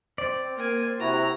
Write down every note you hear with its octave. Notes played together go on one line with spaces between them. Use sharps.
C4 D5
A#3 G#5
C3 E4 F#4 A#5